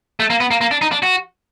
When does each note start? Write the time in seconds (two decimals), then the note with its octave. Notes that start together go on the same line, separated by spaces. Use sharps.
0.20 A3
0.30 A#3
0.40 B3
0.51 A#3
0.61 A#3
0.71 D4
0.82 D#4
0.92 D4
1.03 F#4